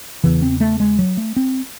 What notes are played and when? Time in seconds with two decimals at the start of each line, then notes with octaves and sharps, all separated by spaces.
0.24 E2 C#3 E3
0.42 C4
0.61 A3
0.80 G#3
0.99 F#3
1.17 A3
1.36 C4